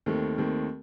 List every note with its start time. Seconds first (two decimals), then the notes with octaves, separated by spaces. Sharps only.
0.06 D#2 D#3 A3 C4
0.38 D#2 D#3 A3 C4